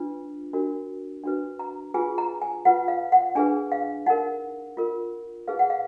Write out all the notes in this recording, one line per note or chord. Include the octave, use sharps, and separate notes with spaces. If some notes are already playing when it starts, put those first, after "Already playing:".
Already playing: D4 F4 B4
D4 F#4 A#4
D4 F#4 B4
A#5
F4 G#4 B4 G#5
A#5
G#5
F4 B4 F#5
F5
F#5
D4 G#4 B4 G#5
F5
D#4 A#4 F#5
F4 A#4
D#4 G#4 B4 F5
F#5
F5